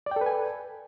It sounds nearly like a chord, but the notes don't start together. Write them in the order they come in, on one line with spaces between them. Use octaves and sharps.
D5 G5 A4 B4 G#5